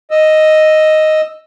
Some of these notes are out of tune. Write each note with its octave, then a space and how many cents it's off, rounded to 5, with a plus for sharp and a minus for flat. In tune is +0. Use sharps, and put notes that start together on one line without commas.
D#5 +0 E6 +0